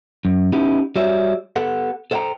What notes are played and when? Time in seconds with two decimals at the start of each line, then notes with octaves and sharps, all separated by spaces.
0.25 F#2
0.53 B3 C#4 D#4 E4 G4
0.96 G3 F#4 C#5 E5
1.56 B3 G4 A4 F#5
2.11 A4 C5 E5 F#5 G5 A#5